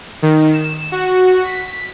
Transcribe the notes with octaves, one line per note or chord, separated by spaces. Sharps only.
D#3
E7
F#4
B6